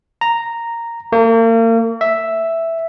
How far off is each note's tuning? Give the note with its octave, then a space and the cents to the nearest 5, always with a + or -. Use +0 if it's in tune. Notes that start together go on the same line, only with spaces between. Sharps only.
A#5 -5
A#3 -40
E5 +0